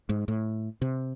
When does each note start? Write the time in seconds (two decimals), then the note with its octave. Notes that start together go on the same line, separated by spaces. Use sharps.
0.09 G#2
0.28 A2
0.82 C3